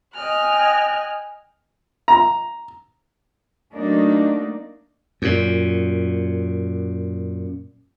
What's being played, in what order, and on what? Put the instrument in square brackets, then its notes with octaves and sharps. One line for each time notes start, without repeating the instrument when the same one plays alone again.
[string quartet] D#5 G5 G#5 F6 F#6
[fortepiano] A#5
[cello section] F#3 A3 A#3 D4 D#4
[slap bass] F#2 A#2